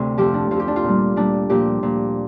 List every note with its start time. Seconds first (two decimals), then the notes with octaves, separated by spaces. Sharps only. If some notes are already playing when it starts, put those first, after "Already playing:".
Already playing: D2 C3
0.18 F2 F3 G4
0.34 D4
0.51 F2 F3 F4
0.60 G4
0.68 D4
0.76 F4
0.84 A#2 G3
1.16 A#2 G3 D4
1.50 A#2 F3 G4
1.83 A#2 F3